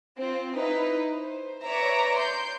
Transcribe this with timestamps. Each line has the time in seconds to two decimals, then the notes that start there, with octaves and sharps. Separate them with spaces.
0.18 C4 F4
0.56 D#4 E4 B4
1.13 C5
1.63 B4 C#5 D5 E5 A#5
2.17 C6 G6